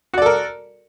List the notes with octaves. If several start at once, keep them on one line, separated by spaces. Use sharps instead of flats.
F#4 A4 A#4 D5